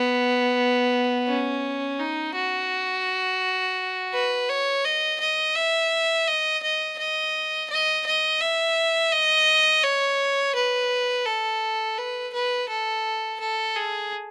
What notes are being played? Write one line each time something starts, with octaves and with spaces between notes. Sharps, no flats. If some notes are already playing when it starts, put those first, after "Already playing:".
Already playing: B3
C#4
D#4
F#4
B4
C#5
D#5
D#5
E5
D#5
D#5
D#5
D#5
D#5
E5
D#5
C#5
B4
A4
B4
B4
A4
A4
G#4